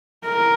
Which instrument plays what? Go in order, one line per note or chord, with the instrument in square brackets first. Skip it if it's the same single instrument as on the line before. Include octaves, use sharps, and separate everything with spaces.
[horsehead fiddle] A#4